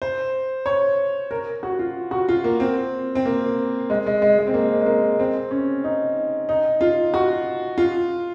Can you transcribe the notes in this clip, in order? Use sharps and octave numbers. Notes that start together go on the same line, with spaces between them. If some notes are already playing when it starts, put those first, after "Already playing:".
C5
C#5
A#4
F#4
F4
F#4
F4
A#3
C4
C4
A#3
G#3
G#3
G#3
G#3
C4
A#3
G#3
A#3
C4
C#4
D#4
D#4
F4
F#4
F4